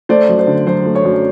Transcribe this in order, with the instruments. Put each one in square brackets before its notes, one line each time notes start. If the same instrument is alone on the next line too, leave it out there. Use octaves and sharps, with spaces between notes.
[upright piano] A3 C5 D5
F#2
C5
D3
F#3 C5
A3
C#5
F#2